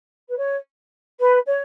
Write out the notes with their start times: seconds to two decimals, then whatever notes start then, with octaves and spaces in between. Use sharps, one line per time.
0.29 B4
0.37 C#5
1.19 B4
1.46 C#5